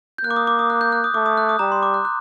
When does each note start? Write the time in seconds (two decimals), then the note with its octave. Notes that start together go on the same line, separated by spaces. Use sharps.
0.18 G6
0.24 A#3 F#6
0.31 D6
0.36 D#6
0.47 D6
0.59 D#6
0.70 F#6
0.81 G6
0.92 F#6
1.04 D#6
1.14 A3 D6
1.26 D#6
1.37 F#6
1.49 D#6
1.59 G3 A#5
1.72 C6
1.83 D6
1.94 F#6
2.05 F#6